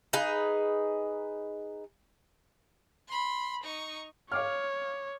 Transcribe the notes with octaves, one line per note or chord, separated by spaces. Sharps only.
D#4 G#4 B4
B5 C6
D#4 C#6
C#5 F5 D6 F6